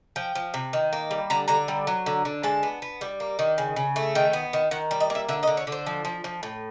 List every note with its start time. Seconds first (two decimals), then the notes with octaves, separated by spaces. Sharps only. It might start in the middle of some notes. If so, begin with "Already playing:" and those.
0.16 F3 G5
0.35 F3
0.54 C3
0.73 D#3
0.93 A#3
1.11 G3
1.30 D3 A#5
1.48 D3 A#5
1.68 G3
1.87 F#3
2.06 D3
2.25 D3
2.43 G#3 A5
2.63 B3
2.82 B3
3.01 G3
3.20 A#3
3.39 D#3
3.58 C#3
3.76 C#3
3.96 A3
4.15 D#3 G5
4.33 B3
4.53 D#3
4.71 D#3 F#5
4.91 G3
5.00 D#5
5.10 A#3
5.15 E5
5.29 D3 E5
5.43 D#5
5.47 D3
5.57 C#5
5.67 D3
5.72 C5
5.86 F3
6.05 F3
6.24 F3
6.43 A2